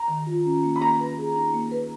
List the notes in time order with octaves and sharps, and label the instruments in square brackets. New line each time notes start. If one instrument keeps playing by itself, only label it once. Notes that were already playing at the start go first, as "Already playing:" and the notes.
Already playing: [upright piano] A#5
[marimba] D#3
F4
C#4
A#3
[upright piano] B5
[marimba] A#3 [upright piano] A#5
[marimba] B4
G#4
D#4
A#3
B4